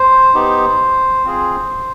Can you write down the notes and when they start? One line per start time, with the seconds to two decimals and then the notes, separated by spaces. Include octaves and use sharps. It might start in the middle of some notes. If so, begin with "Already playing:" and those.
Already playing: C5
0.34 B3 D#4 G4
1.25 C4 F4 G#4